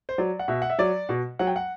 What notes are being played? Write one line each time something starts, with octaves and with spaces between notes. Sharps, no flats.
C5
F#3 D5
F#5
B2 E5
F#5
E5
F#3 D5
B2
F#3 F#5
G5
F#5